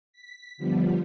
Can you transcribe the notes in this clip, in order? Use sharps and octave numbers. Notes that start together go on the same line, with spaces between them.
B6
D3 F3 G3 B3